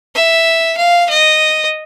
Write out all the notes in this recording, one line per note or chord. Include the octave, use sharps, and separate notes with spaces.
E5
F5
D#5